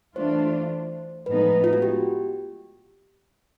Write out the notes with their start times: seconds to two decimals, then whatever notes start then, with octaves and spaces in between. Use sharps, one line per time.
0.16 E3 A3 D4 F4 C5
1.26 A2 F3 G#3 B3 D#4 B4
1.64 F4
1.73 F#4
1.82 G4